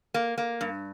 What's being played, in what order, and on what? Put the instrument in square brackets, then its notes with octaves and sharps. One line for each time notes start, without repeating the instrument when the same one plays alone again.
[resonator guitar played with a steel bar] A#3
A#3
G2